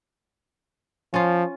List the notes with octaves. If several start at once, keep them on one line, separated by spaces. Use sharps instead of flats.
F3 C#4 F4